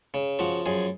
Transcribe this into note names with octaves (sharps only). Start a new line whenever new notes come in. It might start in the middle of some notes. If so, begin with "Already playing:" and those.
C#3
F3 F#4
F#2 G#4